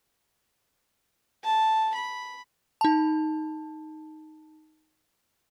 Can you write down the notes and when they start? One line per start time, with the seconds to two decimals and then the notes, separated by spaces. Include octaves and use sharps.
1.44 A5
1.95 B5
2.81 D#4 A5